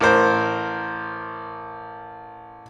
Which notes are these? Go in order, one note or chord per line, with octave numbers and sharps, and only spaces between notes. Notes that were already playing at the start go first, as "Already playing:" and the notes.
A1 A#4 C5